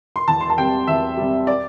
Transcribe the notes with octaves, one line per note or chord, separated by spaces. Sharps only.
C6
E2 A5
C6
A5
C3 G3 G5
E2 E5
C3 G3
D5